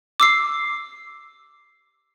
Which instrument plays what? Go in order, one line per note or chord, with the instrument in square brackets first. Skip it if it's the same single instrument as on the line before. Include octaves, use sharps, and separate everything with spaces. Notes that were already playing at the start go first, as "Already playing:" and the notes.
[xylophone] D6 E6 C7